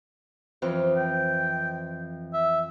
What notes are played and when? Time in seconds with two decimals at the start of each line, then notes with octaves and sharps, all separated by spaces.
0.62 F2 E3 F6
0.97 G5
2.33 E5